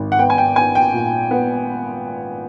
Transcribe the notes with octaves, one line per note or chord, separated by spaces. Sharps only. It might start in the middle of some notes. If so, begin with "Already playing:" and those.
Already playing: G#1
F#5
B3 G5
G#5
G5
B3 G#5
G5
A#2
B3